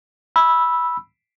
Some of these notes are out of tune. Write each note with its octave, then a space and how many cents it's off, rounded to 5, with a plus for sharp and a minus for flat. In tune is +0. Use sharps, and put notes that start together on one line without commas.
B5 -10 E6 +0